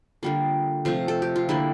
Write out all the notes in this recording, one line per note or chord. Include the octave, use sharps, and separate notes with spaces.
D3 G3 A#3 F4
C3 F3 A3 F4
A4
G4
F4
D3 G3 A#3 E4